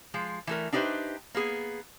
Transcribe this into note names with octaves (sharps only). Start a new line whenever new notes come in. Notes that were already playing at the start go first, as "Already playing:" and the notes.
F3 G#3
E3 A3 A#4
D4 D#4 G4 B4 C5 E5
A#3 B3 G#4